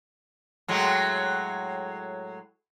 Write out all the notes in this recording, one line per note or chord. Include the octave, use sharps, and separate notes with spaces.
A2 F#3 G#3